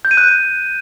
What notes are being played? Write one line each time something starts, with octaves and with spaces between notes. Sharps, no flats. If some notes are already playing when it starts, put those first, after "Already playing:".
G6
D#7
F#6